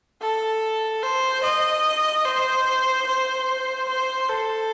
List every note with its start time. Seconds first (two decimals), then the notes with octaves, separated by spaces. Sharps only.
0.22 A4
1.03 C5
1.43 D#5
2.25 C5
3.07 C5
3.89 C5
4.29 A4